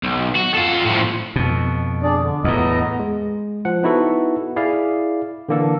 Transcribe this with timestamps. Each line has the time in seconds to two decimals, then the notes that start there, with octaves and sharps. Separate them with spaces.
0.03 B1
0.35 F#4
0.54 F4 A4
0.86 A2 F3
1.36 F2 B2
2.03 D4 G#4 D5
2.21 D3
2.44 E2 A2 B3 D#5 A#5
2.99 G#3
3.65 F3 F#5
3.83 B3 D#4 E4 F#4 A4 B4
4.56 E4 G#4 D5 F5
5.49 D3 E3 A#3 D4 A4